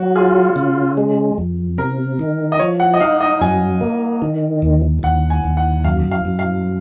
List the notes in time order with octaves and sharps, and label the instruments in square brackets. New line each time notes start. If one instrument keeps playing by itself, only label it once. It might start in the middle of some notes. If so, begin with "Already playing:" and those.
Already playing: [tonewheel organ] F#3 [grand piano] F#4
[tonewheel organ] F4 [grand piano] G#4
[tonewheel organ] C#3
G#3
F2
[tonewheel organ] C3 [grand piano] A#4
[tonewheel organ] D#3
[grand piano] D#5
[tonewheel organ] F3 [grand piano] C#5
[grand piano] F#5
D#5
[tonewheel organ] D#4 [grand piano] F5
[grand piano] D#5
[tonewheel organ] F#2 [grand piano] G#5
[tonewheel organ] A#3
D#3
D#2
[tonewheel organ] D#2 [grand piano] F#5
[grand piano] G#5
[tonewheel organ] D#2
[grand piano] F#5
[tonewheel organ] F#2 [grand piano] F5
[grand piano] F5
[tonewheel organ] F#2
[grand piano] F5